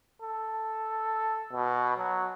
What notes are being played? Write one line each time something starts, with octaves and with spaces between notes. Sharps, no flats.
A4
B2
F#3